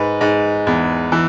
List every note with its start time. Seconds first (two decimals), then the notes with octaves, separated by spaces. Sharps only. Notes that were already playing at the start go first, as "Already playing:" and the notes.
Already playing: G#2 B4
0.21 G#2
0.67 E2
1.12 E3